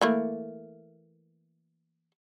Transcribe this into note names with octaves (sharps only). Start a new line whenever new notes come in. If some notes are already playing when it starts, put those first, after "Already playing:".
E3 A3 A#3